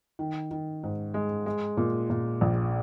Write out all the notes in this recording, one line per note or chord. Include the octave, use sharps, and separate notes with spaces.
D#3
D#3
G#2
G#3
G#3
A#2
A#2
A#1